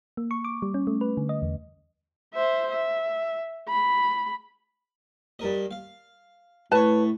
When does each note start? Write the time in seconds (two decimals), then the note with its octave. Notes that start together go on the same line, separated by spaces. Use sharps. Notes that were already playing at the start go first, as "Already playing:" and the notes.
0.17 A#3
0.31 C#6
0.45 D6
0.62 G3
0.74 C#4
0.87 A3
1.01 B4
1.17 D3
1.29 D#5
1.42 E2
2.34 C5 E5
2.72 E5
3.68 B5
5.39 G2 A#4 D#5
5.71 F5
6.72 A2 B4 C#5 A5